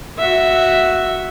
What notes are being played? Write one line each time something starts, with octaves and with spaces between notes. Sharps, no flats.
F#4 E5